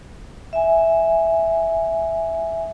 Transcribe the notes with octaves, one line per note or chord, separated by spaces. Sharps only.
E5 G#5